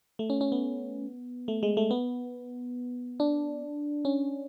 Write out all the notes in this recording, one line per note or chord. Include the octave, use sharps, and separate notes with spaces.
A3
C#4
C#4
B3
A3
G#3
A3
B3
D4
C#4